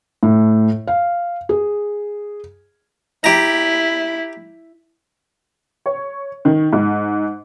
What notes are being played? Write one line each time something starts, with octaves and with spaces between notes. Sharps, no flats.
A2
F5
G#4
E4 G4 A#5
C#5
D#3
G#2